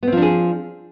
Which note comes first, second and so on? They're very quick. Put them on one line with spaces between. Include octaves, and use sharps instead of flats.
B3 C4 F3 D4 G#4